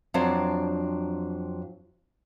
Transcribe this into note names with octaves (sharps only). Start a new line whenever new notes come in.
F2 F#3 C4 D4 C5 D5